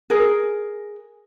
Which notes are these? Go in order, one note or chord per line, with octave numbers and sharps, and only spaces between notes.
G#4 A#4